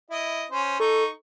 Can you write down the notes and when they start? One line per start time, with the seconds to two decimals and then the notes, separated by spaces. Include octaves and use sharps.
0.10 E4 D#5
0.51 C#4 C5
0.80 D#4 A4 C#6